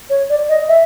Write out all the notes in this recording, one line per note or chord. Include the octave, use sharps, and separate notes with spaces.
C#5
D5
D#5
E5